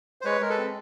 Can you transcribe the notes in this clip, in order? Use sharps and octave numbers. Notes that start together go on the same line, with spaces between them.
C5
G#3 B4 C#5
G#3 A#4
A4 B4
C4